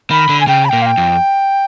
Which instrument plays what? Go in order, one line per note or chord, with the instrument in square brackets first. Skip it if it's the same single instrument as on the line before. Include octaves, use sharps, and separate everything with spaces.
[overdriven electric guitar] D#3 [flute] B5
[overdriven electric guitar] D3
[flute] G#5
[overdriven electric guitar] C#3 [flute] G5
[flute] B5
[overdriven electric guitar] A#2 [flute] G5
[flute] F5
G5
[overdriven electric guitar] F2